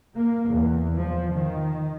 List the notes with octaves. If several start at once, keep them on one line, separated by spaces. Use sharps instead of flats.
A#3
E2
F3
D#3